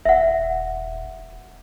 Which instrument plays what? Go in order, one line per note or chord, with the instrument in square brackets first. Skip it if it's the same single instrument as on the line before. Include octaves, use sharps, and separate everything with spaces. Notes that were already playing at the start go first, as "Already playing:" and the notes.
[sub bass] D#1 [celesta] E5 F#5